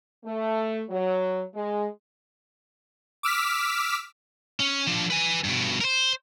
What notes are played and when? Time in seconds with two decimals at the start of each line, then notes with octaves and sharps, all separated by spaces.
0.24 A3
0.89 F#3
1.54 G#3
3.23 D6 E6 F6 B6
4.60 C#4
4.87 F3 D4
5.10 B4 G#5
5.44 G2 B2
5.81 A#4 C5